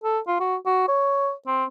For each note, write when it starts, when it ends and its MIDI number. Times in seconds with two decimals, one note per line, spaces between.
0.04 0.19 69
0.27 0.37 65
0.40 0.56 66
0.66 0.83 66
0.88 1.32 73
1.47 1.65 60